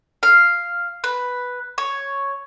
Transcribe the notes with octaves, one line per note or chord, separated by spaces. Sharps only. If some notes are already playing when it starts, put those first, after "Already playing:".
F5
B4
C#5